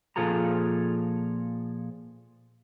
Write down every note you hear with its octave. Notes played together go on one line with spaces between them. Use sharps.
A#2 F3 F4 G#4 A4 A#5